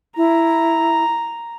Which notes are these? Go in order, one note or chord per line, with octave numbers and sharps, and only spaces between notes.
E4 A#5